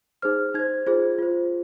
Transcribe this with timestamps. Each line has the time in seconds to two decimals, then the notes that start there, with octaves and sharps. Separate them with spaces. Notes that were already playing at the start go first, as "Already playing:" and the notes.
0.22 D#4 G#4 C5 F6
0.54 D#4 C5 G#6
0.87 F4 G#4 C5
1.19 F4 C5